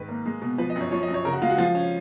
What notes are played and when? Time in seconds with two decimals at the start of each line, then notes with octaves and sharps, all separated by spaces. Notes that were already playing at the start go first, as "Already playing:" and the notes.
Already playing: G#2 D#3 B4
0.09 A#3
0.26 G#3
0.41 B2
0.58 F3 B4
0.70 D#5
0.76 F#2
0.81 C#5
0.92 F3 C#5
1.03 D#5
1.08 F#2
1.14 C#5
1.25 C#3 A#4
1.33 F#4
1.42 G#3 F4
1.50 F#4
1.58 F3 F4
1.75 C#4